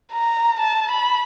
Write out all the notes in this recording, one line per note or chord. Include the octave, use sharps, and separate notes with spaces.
A#5
A5
B5